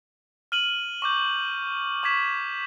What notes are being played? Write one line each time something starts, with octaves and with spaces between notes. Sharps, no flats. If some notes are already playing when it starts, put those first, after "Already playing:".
F6 D#7 F#7
C#6 D6 G6
C#6 D6 G#6 B6 E7